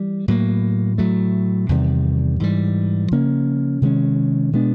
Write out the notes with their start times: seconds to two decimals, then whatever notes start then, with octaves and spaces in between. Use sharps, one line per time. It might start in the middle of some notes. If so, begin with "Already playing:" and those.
Already playing: E3 G3
0.28 A2 F#3 A#3
0.98 A2 F#3 A3
1.69 E2 C3 D#3 G3
2.40 G#2 E3 G3
3.11 C#3 F3 A#3 C#4
3.82 C3 D#3 G#3 C#4
4.53 B2 G#3 B3 D4